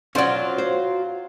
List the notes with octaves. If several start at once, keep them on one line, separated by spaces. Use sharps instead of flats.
F#3 C#4 F4 C5 D5
C5